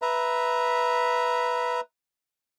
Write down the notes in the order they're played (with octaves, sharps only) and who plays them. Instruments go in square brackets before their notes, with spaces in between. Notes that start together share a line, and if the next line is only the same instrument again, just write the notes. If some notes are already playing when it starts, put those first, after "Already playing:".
[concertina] B4 E5 A#5